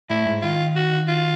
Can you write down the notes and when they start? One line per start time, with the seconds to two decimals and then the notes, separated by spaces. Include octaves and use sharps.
0.10 A2 A3 E4
0.26 G#2 G#3
0.42 D#3 F4
0.76 F#4
1.08 F4